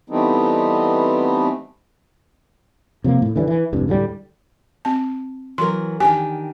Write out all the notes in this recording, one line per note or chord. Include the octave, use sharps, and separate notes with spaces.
E3 G3 A3 B3 C4 D#4
C3 F3 F#3 A#3
A2
D3 E3 F3 G3
E3
F1 C2 G2
D2 A2 E3 G3
C4 A5
E3 F#3 A#4 C6
D#3 D4 G4 G#5